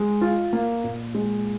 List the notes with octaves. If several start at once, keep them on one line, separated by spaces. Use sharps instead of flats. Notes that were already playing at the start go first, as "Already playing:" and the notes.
Already playing: G#3
F4
A#3
A#2
G#3